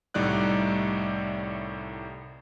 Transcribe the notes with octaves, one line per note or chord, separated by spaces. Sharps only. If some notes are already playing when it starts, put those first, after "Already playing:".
C2 A2 G3 D#4 D5 F#6